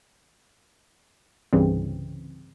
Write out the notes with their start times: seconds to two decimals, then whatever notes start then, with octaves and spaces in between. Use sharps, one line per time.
1.53 C2 G2 C#3 E3 G3 C4